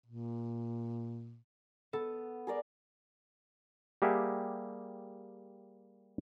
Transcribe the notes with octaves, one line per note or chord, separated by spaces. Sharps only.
A#2
B3 A4
G#4 A#4 D5
G3 A#3 G4 G#4 E5 F#5